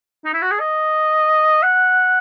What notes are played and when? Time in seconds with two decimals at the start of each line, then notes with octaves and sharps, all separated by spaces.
0.25 D#4
0.33 E4
0.42 F#4
0.51 G#4
0.60 D#5
1.63 F#5